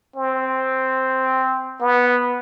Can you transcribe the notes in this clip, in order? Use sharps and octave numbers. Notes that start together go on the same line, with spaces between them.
C4
B3